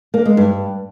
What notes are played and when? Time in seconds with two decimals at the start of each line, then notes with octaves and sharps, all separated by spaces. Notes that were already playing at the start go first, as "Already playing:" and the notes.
0.14 A#3
0.25 G#3
0.37 G2